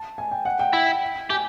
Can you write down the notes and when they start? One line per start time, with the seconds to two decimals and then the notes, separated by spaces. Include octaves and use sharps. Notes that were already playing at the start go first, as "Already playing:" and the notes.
Already playing: A5
0.18 G#5
0.31 G5
0.45 F#5
0.59 G5
0.73 E4
1.30 G4 G#5